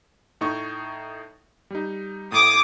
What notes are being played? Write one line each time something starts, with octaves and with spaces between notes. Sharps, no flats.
A2 D#4 C#6
G3 D#4
A2 D6 D#6